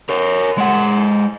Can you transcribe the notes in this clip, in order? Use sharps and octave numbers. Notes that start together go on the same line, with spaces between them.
A#4 C#5
G#3 F#5